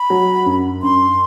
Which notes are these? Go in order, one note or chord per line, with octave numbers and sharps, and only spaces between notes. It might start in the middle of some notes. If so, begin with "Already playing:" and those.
Already playing: B5
F#3
F#2
F#2 C6